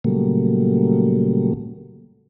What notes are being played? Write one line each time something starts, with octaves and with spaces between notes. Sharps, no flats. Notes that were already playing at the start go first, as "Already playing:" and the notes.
A#2 C#3 F#3 G3 A3 A#3